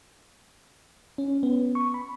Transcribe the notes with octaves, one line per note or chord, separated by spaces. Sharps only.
C#4
B3
C#6
B5